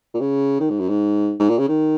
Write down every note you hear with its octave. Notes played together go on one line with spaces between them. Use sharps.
A#2
C#3
D#3
G#2
F#2
G#2
G#2
A#2
C#3
D#3